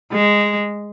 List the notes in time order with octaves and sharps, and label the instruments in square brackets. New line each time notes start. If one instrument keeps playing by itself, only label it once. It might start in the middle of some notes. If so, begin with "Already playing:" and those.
[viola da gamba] G#3